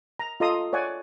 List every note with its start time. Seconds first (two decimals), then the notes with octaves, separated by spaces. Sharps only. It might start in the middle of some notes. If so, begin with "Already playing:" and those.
0.19 A#5
0.40 F4 A4 D#5 A#5 C6 D#6
0.73 C#5 D5 F#5 G#5